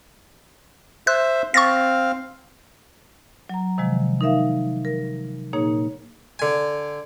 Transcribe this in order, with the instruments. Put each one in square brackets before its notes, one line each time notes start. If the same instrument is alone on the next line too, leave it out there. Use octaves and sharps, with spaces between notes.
[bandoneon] C5 E5 [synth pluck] F#6
[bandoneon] C4 F5 [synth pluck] C#6 A6 A#6
[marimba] F#3 A#5
C3 D#3 F3 G#3
D#4 A#4 E5 F5
A#4
A#2 A#3 D#4 G#4 C#5
[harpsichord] D3 G#5